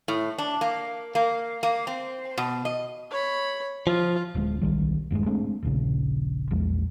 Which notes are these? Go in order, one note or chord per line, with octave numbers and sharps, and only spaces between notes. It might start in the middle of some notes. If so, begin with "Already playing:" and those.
A2
D4
A#3
A#3
A#3
C4
B2
D#5
C#5 B5
F3 F4
D1 D2 E3 G#3
D1 B1 D#3 G3
E1 G2 C#3 G#3
G#3 A3 C4 D4
D#1 A#1 C#3
A#1 E2 G#3